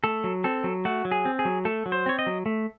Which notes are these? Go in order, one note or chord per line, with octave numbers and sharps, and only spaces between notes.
A3 A4
F#3
C4 A4
F#3
A3 F#4
F#3
G#4
C4
G#4
F#3
A3 A4
F#3
C5
C4 C#5
D#5
F#3
A3